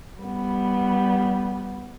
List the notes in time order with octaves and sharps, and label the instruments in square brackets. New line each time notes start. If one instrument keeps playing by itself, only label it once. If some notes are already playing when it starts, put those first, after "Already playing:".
[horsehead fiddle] G3 B3